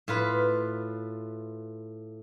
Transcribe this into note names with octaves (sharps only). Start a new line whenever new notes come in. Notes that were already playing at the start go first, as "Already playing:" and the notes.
A2 F4 B4